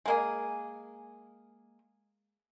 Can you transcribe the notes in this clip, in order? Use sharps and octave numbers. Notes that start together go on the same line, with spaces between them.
G#3 A#3 G#4